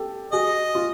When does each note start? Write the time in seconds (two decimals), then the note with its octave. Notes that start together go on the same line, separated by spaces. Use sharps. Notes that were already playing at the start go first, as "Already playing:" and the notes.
Already playing: G4 A4
0.32 F#4 G#4 D#5
0.75 F4